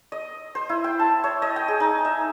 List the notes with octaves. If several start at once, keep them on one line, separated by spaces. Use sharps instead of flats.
D#5
C5
E4
G5
A5
C#5
D#5
G5
G#4
D#4
E5